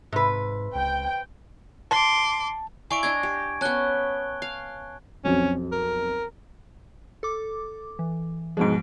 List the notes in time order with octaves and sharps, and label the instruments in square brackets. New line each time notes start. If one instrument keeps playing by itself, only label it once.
[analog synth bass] G#2 [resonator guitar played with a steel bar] C3 B4
[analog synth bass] C#2 [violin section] G5
[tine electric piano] A5 [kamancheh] C6 D6
[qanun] E4 D5 F5 [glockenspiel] G#5 C#6 D7
[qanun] D4 D#5 F5 [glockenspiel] G#6
[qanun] G4
[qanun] B3 C#4 [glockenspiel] A5 F#6 G7
[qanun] F5
[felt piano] B1 F2 [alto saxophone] C#4
[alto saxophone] A#4
[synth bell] A4 D6
E3
[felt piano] G#2 B2 G#3 [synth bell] F3 D7